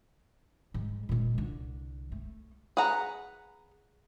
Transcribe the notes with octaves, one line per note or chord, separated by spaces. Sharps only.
G#2 G3
A#2 G#3
C2 D3
A3
G#4 B4 F#5 A#5